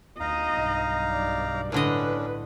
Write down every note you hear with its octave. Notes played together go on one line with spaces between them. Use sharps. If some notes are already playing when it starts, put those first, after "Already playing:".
D2 D#4 D#5 F5 A#5
B1 G2
D5
A2 D3 C#4 D4 B4 D#5